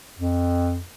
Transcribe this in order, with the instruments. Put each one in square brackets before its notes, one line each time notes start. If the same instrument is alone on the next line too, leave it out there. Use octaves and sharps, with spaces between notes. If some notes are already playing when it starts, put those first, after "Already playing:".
[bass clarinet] F2